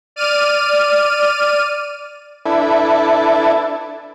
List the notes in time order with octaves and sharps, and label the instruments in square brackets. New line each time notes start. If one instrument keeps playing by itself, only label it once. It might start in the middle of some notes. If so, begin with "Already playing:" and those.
[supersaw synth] D5 F6 D#7
[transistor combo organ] D4 E4 A4 B4